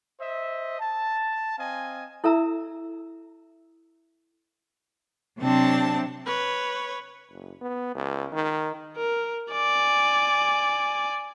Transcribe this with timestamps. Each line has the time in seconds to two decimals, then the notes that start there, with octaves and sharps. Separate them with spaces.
0.20 C5 D#5 E5
0.80 A5
1.58 C4 D#5 F5 G#5
2.24 E4 A4 E5 A#5 E6
5.40 C3 F#3 C4 D4 A5
6.26 B4 C#5
7.30 F#1
7.61 B3
7.95 C#2
8.32 D#3
8.97 A#4
9.52 D5 G#5